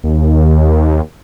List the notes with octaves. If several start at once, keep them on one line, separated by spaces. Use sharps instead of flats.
D#2